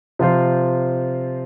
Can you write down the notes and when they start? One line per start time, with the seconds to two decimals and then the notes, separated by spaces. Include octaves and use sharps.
0.19 C3 F3 C4 F4 C5